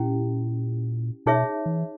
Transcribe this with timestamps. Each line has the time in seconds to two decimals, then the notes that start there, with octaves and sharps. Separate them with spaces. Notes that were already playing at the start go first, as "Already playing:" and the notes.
Already playing: A#2 C#4 E4 G4
1.26 B2 D#4 G#4 C#5 E5
1.66 E3